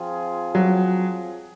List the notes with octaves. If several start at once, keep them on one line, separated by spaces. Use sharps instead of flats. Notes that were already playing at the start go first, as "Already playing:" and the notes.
Already playing: F3 C4 F4 G#4
F#3